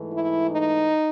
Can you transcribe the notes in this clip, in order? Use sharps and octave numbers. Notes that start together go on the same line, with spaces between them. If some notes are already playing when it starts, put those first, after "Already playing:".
Already playing: G#2 E3 A3
E4
D#4